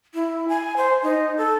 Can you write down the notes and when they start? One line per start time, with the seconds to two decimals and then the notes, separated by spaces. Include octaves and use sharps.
0.14 E4
0.49 G#5
0.77 C5
1.03 D#4
1.37 A4